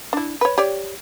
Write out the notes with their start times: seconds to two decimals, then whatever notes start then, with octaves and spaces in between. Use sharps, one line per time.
0.13 D4 E4
0.41 B4 C#5
0.58 G4 C#5 D5